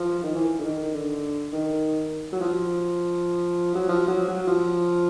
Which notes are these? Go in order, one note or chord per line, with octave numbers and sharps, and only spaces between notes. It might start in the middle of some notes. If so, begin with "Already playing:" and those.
Already playing: F3
D#3
E3
D3
D#3
D3
D#3
F#3
F3
F#3
F3
F#3
F#3
F3